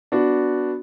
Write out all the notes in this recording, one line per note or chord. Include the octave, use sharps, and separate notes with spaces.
B3 D4 F#4